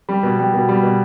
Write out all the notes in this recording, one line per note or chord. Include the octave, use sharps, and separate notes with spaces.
G3
B2
G3
B2
G3
B2